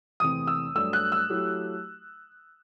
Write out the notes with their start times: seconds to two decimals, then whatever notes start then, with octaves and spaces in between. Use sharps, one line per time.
0.20 E2 C3 E3 A3 C4 D#6
0.47 E6
0.75 G2 F#3 A3 E6
0.93 F#6
1.12 E6
1.30 F#3 A3 E4 G4